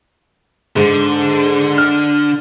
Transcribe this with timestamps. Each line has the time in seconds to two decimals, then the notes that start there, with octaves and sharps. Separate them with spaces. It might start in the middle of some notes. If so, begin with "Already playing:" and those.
0.76 G#2 D3
1.78 F6